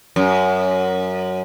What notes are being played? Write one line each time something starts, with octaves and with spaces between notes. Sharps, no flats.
F#2